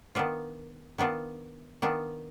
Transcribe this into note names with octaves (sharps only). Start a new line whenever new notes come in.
D#3 B3 D4 F4
D#3 B3 D4 F4
D#3 B3 D4 F4